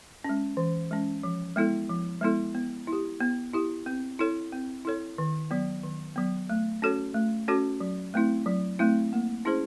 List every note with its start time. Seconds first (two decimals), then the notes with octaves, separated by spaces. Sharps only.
0.24 G#3 C#4
0.57 E3
0.91 G#3 C#4
1.23 F3
1.56 G#3 B3 E4 A4
1.89 F3
2.21 G#3 B3 E4 A4
2.55 B3
2.87 E4
2.92 G4
3.20 B3
3.53 E4 G4
3.86 C4
4.19 E4 A4 C#5
4.52 C4
4.85 E4 A4 C#5
5.18 D#3
5.51 F#3 B3
5.83 D#3
6.16 F#3 B3
6.50 A3
6.82 C#4 F#4 A4 C#5
7.15 A3
7.48 C#4 F#4 A4 C#5
7.80 F#3
8.14 A3 C4 E4
8.46 F#3
8.79 A3 C4 E4
9.13 A#3
9.45 C#4 E4 G#4 C5